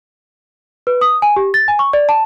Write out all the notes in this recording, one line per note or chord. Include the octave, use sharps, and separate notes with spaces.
B4
D#6
G#5
G4
A6
G#5
C#6
D5
A5